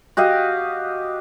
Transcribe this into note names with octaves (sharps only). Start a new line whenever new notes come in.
F#4 G4 D#5 F5